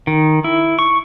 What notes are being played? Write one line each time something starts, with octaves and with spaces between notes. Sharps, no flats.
D#3
E4
C#6